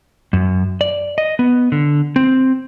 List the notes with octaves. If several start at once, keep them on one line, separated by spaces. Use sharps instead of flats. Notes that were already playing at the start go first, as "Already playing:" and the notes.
F#2
D5
D#5
B3
D3
C4